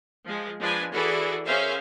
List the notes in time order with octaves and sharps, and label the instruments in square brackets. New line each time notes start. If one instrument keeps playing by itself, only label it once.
[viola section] F3 G#3
F3 G#3 D4 B4 G#5
E3 E4 F#4 G#4 A4 D5
C#4 G#4 A#4 C5 E5 F5